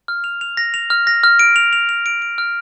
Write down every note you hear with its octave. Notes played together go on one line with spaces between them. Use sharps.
F6
F7
F7
A#6
F7
F6
A#6
F6
D7
F7
F7
F7
D7
D7
F6